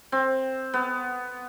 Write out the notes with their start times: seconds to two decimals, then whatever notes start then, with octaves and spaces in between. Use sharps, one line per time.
0.12 C4
0.74 B3